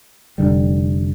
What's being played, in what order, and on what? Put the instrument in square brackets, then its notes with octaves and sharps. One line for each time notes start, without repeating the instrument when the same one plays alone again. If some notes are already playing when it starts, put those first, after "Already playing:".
[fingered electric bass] F1 D#2 D3 G3